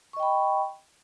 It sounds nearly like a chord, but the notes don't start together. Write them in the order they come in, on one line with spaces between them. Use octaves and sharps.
C#6 D#5 G5 B5